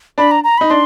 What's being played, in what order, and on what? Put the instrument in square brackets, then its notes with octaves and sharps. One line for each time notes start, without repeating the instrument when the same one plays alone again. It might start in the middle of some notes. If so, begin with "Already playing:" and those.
[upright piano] D4 [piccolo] B5
[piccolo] A#5
A#5
[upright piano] D#4 [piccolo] B5
[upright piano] D4 [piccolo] C6